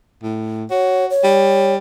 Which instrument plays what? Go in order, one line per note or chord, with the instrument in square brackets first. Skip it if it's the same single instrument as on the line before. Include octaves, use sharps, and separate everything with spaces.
[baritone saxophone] A2
[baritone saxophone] F#4 [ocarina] C#5
[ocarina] C#5
[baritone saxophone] G3